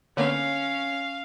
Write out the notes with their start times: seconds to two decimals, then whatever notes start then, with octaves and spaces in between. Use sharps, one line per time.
0.17 D3 A#3 B3 C#4 C#5 F5